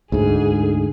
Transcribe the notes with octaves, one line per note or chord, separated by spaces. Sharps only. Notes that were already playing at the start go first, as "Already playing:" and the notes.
D2 G#2 G#4